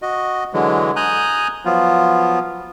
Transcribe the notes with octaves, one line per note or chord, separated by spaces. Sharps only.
F#4 D#5
D3 E3 F#3 G#3
G#5 A#5 D#6 F#6 G6
F3 F#3 B3 F4